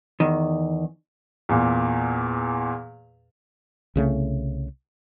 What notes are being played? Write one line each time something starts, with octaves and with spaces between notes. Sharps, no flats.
E2 D#3
E2 A#2
C2 C#3 G#3 A3